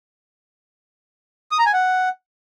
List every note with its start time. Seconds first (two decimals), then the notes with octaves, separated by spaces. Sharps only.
1.51 D#6
1.59 A#5
1.66 G#5
1.73 F#5